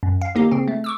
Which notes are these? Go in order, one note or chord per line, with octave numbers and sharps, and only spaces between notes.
F#2
F5
D3 D#3 A#3 D#4 G4
C#3 C4
A3
C#6 D6 E6